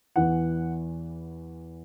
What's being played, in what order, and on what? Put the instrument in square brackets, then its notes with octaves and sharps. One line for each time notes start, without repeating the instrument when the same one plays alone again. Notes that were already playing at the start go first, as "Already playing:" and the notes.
[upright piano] E2 E3 B3 F#5